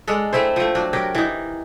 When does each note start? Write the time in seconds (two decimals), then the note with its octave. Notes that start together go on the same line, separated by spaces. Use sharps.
0.07 G#3 D4 A4
0.33 A3 C4 E4 C5
0.56 F3 A3
0.75 F#3 D4
0.93 F#3 G4 A#4
1.15 E3 D#4